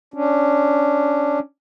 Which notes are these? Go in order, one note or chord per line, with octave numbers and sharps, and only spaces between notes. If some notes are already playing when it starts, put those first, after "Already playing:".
C#4 D4